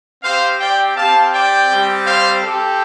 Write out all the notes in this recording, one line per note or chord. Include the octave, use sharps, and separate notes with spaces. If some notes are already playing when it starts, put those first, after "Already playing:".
C4 G4 C5 F5
D5 G5
C4 G4 F5 A5
D5 G5
G3 C4 G4
C5 F5
C4 G4 A4